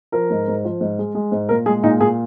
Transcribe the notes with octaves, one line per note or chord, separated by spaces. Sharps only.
F3 A#4
G#2
G#2
F3
G#2
G#3
G#3
G#2
A#2 A#4
G#3 G#4
A#2 D#4
A#2 G#4